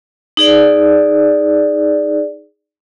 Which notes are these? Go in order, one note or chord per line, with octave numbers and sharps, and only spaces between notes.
D#4 G#4 D5